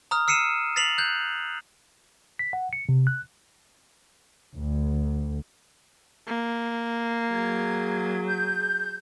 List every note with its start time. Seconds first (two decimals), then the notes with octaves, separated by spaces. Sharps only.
0.11 A#5 D#6 F6
0.28 E6 C7 C#7 D#7 E7
0.76 A6 B6 C7 F7 F#7
0.98 F#6 G6
2.39 B6
2.53 F#5
2.73 C#7
2.89 C3
3.07 F#6
4.57 D2
6.27 A#3
7.32 F#3 G#4 G#6
8.26 G6